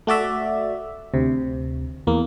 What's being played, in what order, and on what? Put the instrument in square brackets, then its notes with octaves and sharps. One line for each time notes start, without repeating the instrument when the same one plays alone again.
[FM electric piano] A3 F#4 D5 E5
D2 C3
E2 A#3